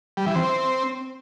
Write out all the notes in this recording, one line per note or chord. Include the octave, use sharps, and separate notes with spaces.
G3
E3
C4